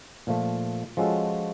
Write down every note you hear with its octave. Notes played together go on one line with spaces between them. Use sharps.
A#2 F3 A3
F3 G#3 C#4 F#4 A4